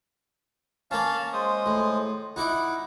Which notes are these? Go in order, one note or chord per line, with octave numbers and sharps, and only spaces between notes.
A#3 C#4 F5 A5
G#3 C5 D#6
A2
D#4 E4 F#5 D6